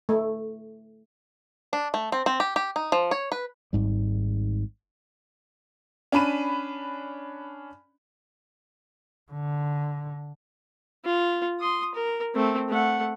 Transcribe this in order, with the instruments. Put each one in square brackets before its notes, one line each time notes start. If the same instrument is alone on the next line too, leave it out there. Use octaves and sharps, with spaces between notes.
[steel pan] A3
[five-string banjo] D4
A3
C4
C4
G4
G4
D#4
F3
C#5
B4
[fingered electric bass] G#1 G#2 G3
[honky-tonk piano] C#4 D4 B5 D#7
[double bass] D3
[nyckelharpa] F4
C6 D#6
A#4
A3 C4
A3 F#5